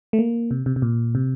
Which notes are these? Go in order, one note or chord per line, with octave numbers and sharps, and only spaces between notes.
A3
A#3
C3
C3
C3
A#2
C3